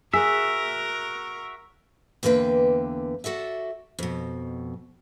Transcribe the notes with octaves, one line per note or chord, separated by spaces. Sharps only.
F#4 G#4 A#4 E5
E2 D3 A#3 B4 G5
F#4 A4 D5 E5
F2 B2